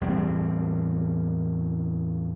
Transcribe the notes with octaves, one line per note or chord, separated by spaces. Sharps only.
E2 A2 G3 C4